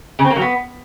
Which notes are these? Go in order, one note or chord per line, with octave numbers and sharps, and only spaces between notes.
C#3
C4
A#3
F#3
B3